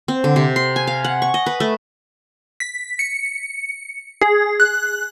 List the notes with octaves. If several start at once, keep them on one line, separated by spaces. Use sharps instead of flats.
C4
D3
C3
C6
G#5
F5
F#5
C#6
D#5
B4
A3
B6
C#7
G#4
F#6